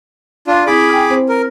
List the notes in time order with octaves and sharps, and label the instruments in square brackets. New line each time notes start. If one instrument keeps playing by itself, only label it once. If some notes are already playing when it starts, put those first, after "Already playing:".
[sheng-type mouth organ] D4 F4
[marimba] C4 E4 [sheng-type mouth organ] G#4 B5 D6
[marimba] G5 G#5 F6
C4 C5
[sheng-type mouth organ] A#4